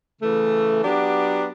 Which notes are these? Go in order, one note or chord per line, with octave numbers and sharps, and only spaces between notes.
C#3 E3 A3
F#3 B3 D4 G4